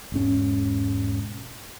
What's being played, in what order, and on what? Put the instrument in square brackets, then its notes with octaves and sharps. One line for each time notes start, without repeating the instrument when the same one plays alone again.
[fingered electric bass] E1 G#2 C#4